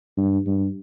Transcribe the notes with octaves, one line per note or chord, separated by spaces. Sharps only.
G2
G2